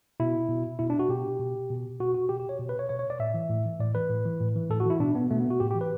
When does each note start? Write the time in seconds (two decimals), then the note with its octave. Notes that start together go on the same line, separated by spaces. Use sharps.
0.20 B2 E4
0.49 B2
0.79 B2 E4
0.90 D4
0.99 F#4
1.09 B2 G4
1.39 B2
1.70 B2
2.00 B2 F#4
2.14 F#4
2.29 B2 G4
2.40 G4
2.49 C#5
2.59 B2
2.69 B4
2.79 C#5
2.89 B2 C#5
2.99 C#5
3.10 D5
3.20 A2 E5
3.34 E3
3.49 A2
3.66 E3
3.79 A2 D5
3.95 E3 B4
4.09 A2
4.25 E3
4.40 A2
4.56 E3
4.70 A2 A4
4.80 F#4
4.86 E3 E4
5.00 B2 D4
5.15 B3
5.30 B2 A3
5.40 B3
5.50 F#4
5.60 A2 G4
5.71 G4
5.75 E3
5.81 B4